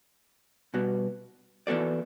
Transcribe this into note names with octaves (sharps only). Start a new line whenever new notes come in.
B2 G3 B3 F#4
E3 B3 F#4 A4 D5